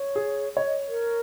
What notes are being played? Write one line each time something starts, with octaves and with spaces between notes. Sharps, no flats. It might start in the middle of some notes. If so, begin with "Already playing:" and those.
Already playing: C#5
G#4
C#5 D#5
D#5
A#4